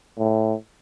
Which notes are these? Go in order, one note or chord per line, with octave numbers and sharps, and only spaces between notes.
A2